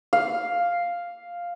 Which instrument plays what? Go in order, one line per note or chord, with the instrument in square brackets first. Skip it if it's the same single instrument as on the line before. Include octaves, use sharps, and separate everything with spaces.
[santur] F5